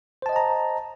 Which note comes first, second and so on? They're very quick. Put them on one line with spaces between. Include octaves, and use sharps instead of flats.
C5 A5 D#5 G5 A#5